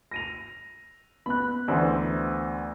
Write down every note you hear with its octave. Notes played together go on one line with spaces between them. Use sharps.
A#6 D#7 F7
B3 B5 F#6
D2 E3 C5